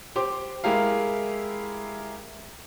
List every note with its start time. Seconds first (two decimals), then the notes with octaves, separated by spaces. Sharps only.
0.16 G4 C5 D6
0.64 G#3 E4 G4 A#4 F5